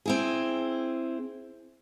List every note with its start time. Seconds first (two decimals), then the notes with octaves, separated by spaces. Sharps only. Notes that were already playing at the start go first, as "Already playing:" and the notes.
0.06 C4 E4 G#4